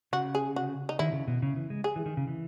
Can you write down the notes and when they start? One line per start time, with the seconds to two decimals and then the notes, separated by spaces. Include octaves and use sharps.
0.13 C#3 F#4
0.35 G#4
0.56 F#4
0.89 D#4
0.99 D#3 E4
1.13 C#3
1.28 B2
1.42 C#3
1.56 E3
1.70 G#3
1.84 G#4
1.96 E3
2.06 D#3
2.17 C#3
2.28 E3